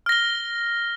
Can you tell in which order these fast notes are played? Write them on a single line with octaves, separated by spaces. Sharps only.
F6 A#6 G7